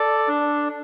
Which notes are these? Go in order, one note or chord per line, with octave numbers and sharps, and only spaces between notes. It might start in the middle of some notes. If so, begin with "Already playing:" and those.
Already playing: A4 D5
D4